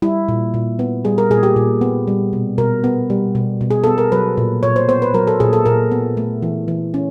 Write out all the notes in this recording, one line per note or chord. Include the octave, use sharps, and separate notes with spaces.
G3 E4
A#2
A#2
B3
G3 G#4
A#4
A#2 G#4
G4
A#2
B3
G3
B2
B2 A#4
B3
G3
B2
B2
G#4
B3 A4
A#4
F#3 B4
A#2
A#2 C#5
C5
B3 C5
B4
F#3 A#4
A4
A#2 G#4
A4
A#2 A#4
B3
A3
E3
E3
C#4